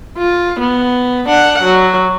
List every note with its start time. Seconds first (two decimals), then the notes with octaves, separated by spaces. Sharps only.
0.18 F4
0.60 B3
1.29 D4 F#5
1.63 F#3